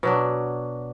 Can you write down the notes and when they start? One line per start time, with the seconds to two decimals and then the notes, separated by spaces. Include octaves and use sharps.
0.03 B2 F#3 D4